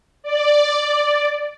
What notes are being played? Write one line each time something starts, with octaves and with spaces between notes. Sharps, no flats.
D5